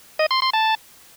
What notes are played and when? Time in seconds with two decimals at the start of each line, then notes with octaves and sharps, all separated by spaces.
0.19 D#5
0.31 C6
0.42 C6
0.53 A5